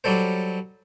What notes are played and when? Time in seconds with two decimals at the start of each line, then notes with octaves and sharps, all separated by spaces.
0.04 F#3 G3 A4 C5